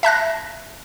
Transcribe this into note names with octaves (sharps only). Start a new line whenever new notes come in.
E5 A5 F#6 A#6